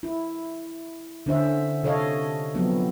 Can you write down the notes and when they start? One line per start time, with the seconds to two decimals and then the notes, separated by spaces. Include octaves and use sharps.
0.03 E4
1.26 D3 C#4 C5 E5
1.83 C3 A4 C#5 D#5 F5
2.54 F3 F#3 B3 C4